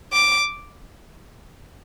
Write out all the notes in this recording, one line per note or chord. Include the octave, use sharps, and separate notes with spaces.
D6